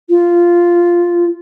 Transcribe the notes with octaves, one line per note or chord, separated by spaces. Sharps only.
F4